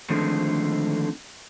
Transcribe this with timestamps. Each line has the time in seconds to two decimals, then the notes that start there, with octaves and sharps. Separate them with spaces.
0.10 D3 D#3 F3 G#3 A3 C4